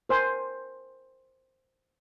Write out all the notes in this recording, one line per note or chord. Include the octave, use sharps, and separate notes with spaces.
A#4 C5 G#5